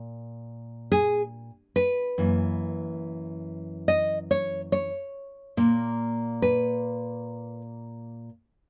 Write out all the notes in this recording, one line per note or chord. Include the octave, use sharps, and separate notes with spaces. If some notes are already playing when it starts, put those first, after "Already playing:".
Already playing: A#2
G#4
B4
F#2 E3 A#3
D#5
C#5
C#5
A#2 A#3
B4